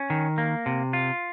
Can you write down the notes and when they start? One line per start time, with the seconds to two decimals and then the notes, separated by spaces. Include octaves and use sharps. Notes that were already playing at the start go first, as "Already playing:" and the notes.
Already playing: C#4
0.10 D#3
0.38 A#3
0.66 C3
0.93 F4